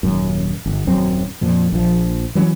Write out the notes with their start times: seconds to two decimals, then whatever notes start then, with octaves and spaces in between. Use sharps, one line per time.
0.03 D#1 F#2
0.66 G1
0.87 D#1 F#2 F#3 C4
1.41 F2 A#2 F3
1.72 A#1 F3
2.35 E3 F#3 G#3 C#4